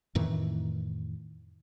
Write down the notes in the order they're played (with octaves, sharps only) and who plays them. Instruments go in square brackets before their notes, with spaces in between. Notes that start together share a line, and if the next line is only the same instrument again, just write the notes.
[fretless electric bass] F2 A2 D#3 E3